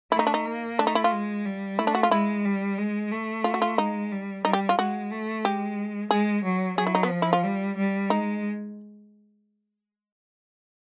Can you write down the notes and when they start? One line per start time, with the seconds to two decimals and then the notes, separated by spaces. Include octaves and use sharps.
0.12 A3 E4
0.19 D#4
0.27 D4
0.34 D#4
0.45 A#3
0.79 A3 D4
0.87 D#4
0.95 E4
1.04 F4
1.12 G#3
1.46 G3
1.79 A3 E4
1.87 D4
1.95 F#4
2.03 F4
2.11 G#3 E4
2.45 G3
2.78 G#3
3.12 A3
3.44 F4
3.54 F#4
3.62 F4
3.78 G#3 D#4
4.12 G3
4.45 G3 D#4
4.53 G4
4.69 F4
4.78 G#3 F#4
5.11 A3
5.45 G#3 G4
6.11 G#3 G#4
6.44 F#3
6.78 F#3 G#4
6.87 E4
6.95 D#4
7.03 B3
7.11 F3
7.22 E4
7.33 F4
7.44 G3
7.78 G3
8.10 G#3 D#4